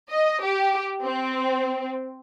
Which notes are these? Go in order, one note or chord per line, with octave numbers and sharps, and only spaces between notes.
D#5
G4
C4